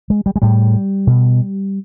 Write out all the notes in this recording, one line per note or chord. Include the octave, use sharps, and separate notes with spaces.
G#3
G3
G#3
A2 G3
B2